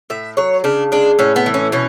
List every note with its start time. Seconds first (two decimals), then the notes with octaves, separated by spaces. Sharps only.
0.10 A2 E5
0.37 F#3 C#5
0.64 C#3 D4
0.92 G#3 D4
1.19 A2 C#4
1.36 B3
1.46 E3
1.54 C#4
1.72 B2 C#4